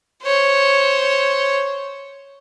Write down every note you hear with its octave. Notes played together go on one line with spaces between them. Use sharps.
C5 C#5